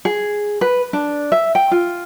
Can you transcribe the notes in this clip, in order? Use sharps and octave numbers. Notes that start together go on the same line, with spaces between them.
G#4
B4
D4
E5
G5
F4